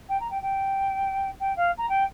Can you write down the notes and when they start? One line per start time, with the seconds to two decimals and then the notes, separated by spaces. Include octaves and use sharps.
0.09 G5
0.20 A#5
0.30 G5
0.42 G5
1.40 G5
1.56 F5
1.78 A#5
1.89 G5